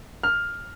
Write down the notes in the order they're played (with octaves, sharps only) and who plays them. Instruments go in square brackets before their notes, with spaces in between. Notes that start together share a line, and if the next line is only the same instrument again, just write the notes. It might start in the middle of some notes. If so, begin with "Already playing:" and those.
[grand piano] F6